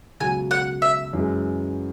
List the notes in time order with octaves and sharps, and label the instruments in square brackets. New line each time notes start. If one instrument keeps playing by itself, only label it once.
[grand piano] C#2 B2 F#3 [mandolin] G#5
[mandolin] F#5
E5
[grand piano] F#2 E3 G#3